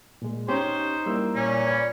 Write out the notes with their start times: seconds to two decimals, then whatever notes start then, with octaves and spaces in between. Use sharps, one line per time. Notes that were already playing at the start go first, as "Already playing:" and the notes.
0.22 A#2 G#3
0.48 C#4 D#4 G4 C5 C#5
1.06 G3 A#3 E4 E6
1.35 A#2 C#4
1.67 B4 D5 B5